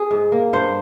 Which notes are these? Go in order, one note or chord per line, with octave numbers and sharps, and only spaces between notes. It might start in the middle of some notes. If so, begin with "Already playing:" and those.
Already playing: G#4
G#2
A#3
G2 C5